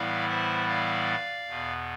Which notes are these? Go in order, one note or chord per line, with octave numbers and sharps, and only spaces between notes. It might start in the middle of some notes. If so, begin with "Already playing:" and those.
Already playing: A2 E3 G3 B3 E4 D5 F5
C5 E5
D5 F5
E2 B2 B3